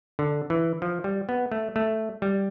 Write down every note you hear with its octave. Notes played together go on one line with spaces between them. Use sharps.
D3
E3
F3
G3
B3
A3
A3
G3